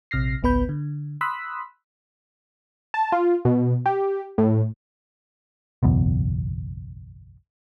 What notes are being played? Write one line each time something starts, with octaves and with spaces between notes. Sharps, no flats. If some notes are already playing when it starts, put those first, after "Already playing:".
A#1 C3 F6 A#6 C7
G#1 C#2 B3 B4 B5 G6
D3
B5 C6 D#6 E6 F#6 B6
A5
F4
B2
G4
A2
F#1 B1 E2